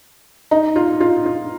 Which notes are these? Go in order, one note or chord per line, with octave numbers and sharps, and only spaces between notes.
D#4
F4
F4
F4